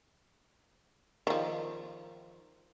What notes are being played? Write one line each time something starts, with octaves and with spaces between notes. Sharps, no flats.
D#3 F3